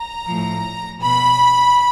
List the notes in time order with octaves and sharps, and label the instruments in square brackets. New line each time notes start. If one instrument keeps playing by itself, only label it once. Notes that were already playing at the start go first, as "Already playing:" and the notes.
Already playing: [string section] A#5
A2 F3
B2 B5